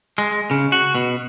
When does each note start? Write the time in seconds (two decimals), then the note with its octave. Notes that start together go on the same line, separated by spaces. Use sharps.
0.18 G#3
0.51 C#3
0.72 F#4
0.95 B2